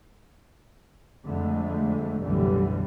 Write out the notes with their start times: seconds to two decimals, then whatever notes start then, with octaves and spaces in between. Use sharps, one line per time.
1.25 F2 D3 G#3 A3
2.22 B1 F#2 A2 D3 E3 G3